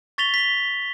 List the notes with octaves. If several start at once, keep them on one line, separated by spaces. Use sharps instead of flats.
C#6 A6 B6 F7 G7
B6 G7